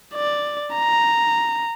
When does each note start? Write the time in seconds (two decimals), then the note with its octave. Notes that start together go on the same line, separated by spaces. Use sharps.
0.14 D5
0.74 A#5